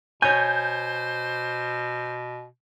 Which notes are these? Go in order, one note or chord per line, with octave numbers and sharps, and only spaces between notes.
B2 C5 C#5 G#5 G6